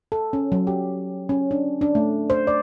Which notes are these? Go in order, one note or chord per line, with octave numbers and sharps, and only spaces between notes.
A4
C#4
F#3
G4
C#4
D4
D4
A3
C5
D5